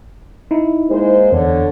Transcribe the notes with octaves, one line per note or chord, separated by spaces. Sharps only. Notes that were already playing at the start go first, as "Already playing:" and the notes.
D#4 E4
G#3 A#3 C5
E2 D3 C#5